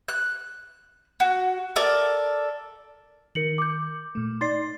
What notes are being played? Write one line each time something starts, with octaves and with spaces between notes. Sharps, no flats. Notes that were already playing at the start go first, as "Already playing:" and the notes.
F#6
F#4
A4 A#4 D5
D#3 A#4 C#7 F#7
D6 G6
A#2 A3
D#4 D5 C6 A6 C7